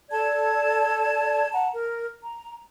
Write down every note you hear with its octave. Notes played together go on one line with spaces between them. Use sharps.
A4 D5 A5 G#6
F#5 A5 A#5
A#4
A#5